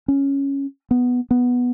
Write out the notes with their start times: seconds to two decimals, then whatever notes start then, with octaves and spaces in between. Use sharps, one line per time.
0.08 C#4
0.91 B3
1.31 B3